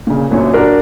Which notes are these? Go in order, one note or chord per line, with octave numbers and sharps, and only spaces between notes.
A#2 C#3
F#1 F#2 A#2 C#5
D4 F#4 A#4 D5